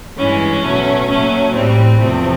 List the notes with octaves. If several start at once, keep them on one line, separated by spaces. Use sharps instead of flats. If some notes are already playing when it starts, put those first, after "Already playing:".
G2 E3 G#3 C#4
B2 F#3 A3
A#2 F#3 A3 C#4
A2 E3 G3 C4
E2 C3 F3 A3